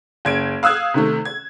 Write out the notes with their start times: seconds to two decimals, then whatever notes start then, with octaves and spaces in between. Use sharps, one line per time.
0.25 F#1 G#6 D7
0.63 F5 D#6 E6 F#6 G#6
0.94 C3 D#3 A3
1.25 G#6